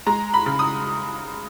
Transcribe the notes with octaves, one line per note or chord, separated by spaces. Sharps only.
G#3 A#5
B5
C#3
D#6